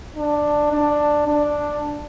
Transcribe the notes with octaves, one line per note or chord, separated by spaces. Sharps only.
D4
D4
D4